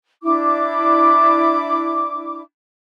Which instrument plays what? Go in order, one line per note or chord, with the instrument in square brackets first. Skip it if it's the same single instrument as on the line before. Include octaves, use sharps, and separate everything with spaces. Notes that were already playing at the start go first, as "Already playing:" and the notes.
[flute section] D4 E4 D6